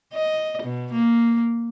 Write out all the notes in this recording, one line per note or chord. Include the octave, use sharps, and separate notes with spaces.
D#5
B2
A#3